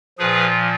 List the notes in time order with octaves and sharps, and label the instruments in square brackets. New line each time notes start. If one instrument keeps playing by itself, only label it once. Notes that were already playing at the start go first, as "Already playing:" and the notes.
[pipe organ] A#2 F3 G#4 B4